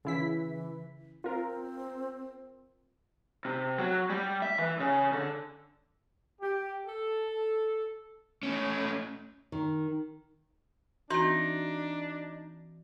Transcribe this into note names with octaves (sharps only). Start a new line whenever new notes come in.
C#3 E3 E4 B6
C4 F4 A#4
C3
F#3
G3
E5
E3
C#3
D3
G4
A4
A2 C#4
D#3
E3 C4 D4 D#4 F#4